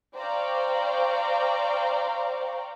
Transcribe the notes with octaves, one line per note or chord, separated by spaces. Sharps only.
C5 D5 F5 G5 A#5 C#6